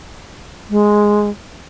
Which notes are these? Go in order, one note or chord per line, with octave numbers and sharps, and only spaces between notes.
G#3